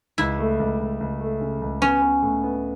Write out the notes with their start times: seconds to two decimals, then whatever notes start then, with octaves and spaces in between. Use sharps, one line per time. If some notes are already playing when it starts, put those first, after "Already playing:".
0.18 C#2 E4
0.39 A3
0.60 C#2
0.79 C#2
1.00 C#2
1.21 A3
1.40 C#3
1.62 C#2
1.81 B3 C#4
2.02 B3
2.22 A2
2.43 B3